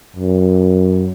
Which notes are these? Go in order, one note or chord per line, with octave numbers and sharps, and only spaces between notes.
F#2